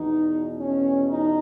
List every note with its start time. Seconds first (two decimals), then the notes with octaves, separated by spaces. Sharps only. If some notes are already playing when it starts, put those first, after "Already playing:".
Already playing: E2 B2 D#4
0.56 C#4
1.08 D#4